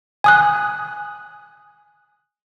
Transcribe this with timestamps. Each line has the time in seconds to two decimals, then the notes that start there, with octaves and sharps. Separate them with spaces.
0.24 G#5 D#6 F#6